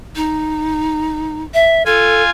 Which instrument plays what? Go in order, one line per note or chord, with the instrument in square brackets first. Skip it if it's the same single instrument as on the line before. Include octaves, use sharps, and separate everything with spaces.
[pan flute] D#4
E5
[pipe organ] F4 G#5 [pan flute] A4